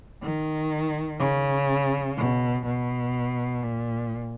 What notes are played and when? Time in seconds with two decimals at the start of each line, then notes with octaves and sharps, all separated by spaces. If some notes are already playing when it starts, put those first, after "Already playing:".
0.23 D#3
1.20 C#3
2.17 B2
2.66 B2
3.63 A#2